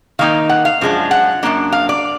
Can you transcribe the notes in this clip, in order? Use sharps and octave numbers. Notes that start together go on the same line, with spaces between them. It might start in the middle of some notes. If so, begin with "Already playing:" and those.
D#3 A#3 D#4 F5
F#5
F5
F#2 F3 G#3 D4
F#5
F#2 D#3 A#3 D4
F5
D5